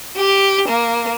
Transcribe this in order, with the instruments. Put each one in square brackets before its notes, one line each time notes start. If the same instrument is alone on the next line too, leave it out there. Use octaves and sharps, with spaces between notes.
[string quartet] G4
A#3